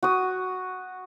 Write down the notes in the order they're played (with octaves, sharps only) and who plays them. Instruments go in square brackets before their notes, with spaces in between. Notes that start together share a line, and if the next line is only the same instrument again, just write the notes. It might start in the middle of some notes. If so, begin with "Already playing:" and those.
[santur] F#4 D#6